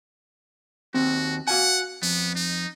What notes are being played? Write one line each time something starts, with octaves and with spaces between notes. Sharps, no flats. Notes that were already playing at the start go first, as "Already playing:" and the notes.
D#2 C4 F#4
F#4 F5 F#5 G#5
F2 B3
D#4